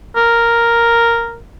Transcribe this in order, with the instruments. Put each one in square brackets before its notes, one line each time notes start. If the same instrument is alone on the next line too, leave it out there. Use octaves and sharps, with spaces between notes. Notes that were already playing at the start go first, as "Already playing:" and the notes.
[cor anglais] A#4